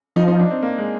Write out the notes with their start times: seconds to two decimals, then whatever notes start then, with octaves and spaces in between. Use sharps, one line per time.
0.16 F3 D#4
0.28 D#4
0.39 D4
0.51 C4
0.62 A#3
0.78 G#3